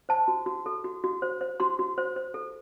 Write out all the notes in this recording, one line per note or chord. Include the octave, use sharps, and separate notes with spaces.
C5 A5
F#4
F#4
A4
F#4
F#4
C5
C5
F#4 C6
F#4
C5
C5
A4